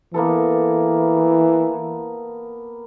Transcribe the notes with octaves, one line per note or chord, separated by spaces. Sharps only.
E3 A#3 B3 A4